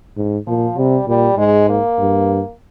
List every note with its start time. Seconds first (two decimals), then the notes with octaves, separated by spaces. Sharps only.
0.17 G#2
0.47 A#2 F3
0.78 C3 G3
1.08 A#2 G3
1.38 G#2 G#3
1.69 A#3
1.99 G2